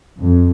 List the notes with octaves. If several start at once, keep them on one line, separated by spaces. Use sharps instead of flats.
F2